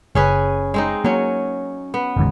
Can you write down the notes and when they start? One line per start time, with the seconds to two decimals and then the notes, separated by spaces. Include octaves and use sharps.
0.15 F#1 C#4 G#4 B4
0.74 G#3 C4 D#4
1.05 F#3 A#3 C#4
1.94 B3
2.17 F#1 D#2 G#2